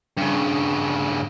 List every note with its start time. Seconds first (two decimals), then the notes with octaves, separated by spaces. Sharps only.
0.18 G2 C#3